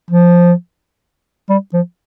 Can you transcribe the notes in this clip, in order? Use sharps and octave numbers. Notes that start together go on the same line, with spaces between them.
F3
G3
F3